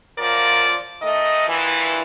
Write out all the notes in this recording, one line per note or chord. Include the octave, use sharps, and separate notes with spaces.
F#2 F3 F4 A#4 D5
D#3 A3 D#5
G2 A#2 E3